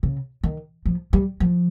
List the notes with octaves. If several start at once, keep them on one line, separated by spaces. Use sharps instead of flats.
C#3
D#3
F3
G3
F3